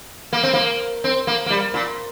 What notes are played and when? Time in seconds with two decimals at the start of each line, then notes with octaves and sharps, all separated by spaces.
0.33 A#3
0.43 C4
0.54 A#3
1.04 C4
1.27 A#3
1.46 A#3
1.50 G3
1.74 A#2